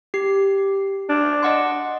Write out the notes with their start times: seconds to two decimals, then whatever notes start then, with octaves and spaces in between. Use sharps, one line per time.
0.14 G4 C7
1.09 D4
1.43 D#5 F#5 C6